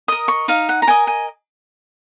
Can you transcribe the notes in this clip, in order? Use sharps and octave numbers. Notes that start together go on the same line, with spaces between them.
A#4 D#5 D#6
C#6
D#4 F5
F#5
A#5
A#4 D#5 G#5
G#5